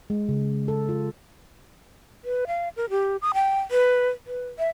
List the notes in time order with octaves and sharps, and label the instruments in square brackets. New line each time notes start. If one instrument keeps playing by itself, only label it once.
[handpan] G#3
C#3
A4
F4
[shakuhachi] B4
F5
A#4
G4
D#6
G5
B4
B4
E5